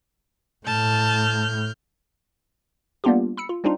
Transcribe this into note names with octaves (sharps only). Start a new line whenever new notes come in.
A2 A5 F6 G6
G3 A#3 B3 D4 F4 G4
B5 E6 C#7
F4
G3 C4 D4 D#4 F4